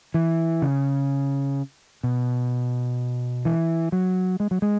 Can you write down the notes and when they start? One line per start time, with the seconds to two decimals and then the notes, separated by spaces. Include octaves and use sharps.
0.14 E3
0.62 C#3
2.03 B2
3.45 E3
3.92 F#3
4.40 G#3
4.51 F#3
4.62 G#3